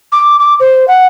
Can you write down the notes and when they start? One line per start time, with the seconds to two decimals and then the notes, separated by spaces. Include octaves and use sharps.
0.12 D6
0.40 D6
0.60 C5
0.88 F#5